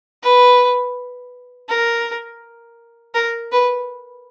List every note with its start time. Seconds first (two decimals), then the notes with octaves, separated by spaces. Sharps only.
0.23 B4
1.69 A#4
3.15 A#4
3.52 B4